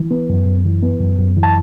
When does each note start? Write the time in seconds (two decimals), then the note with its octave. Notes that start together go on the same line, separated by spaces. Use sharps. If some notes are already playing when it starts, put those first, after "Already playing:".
Already playing: E3
0.11 B3
0.30 F#2
0.46 F#2
0.65 E3
0.83 B3
1.00 F#2
1.19 F#2
1.37 E3
1.43 A5